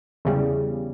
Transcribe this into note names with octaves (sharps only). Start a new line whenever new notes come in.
E2 C#3 G3